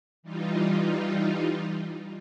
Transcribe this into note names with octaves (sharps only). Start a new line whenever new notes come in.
E3 G3 D#4 F4